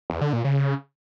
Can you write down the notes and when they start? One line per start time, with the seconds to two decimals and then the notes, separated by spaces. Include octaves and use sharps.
0.10 E2
0.21 D3
0.33 A#2
0.45 C#3